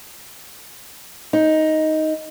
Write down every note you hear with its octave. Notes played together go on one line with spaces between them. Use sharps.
D#4